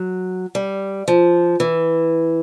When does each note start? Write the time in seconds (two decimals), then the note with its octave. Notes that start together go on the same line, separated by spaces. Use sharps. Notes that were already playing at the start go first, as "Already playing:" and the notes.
Already playing: F#3
0.55 G3
1.08 F3
1.60 E3